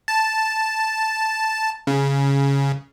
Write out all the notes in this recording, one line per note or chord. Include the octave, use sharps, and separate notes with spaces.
A5
C#3